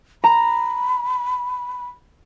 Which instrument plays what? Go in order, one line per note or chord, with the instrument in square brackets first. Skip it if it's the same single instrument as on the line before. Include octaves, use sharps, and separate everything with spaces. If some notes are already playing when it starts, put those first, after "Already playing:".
[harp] A#5 [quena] B5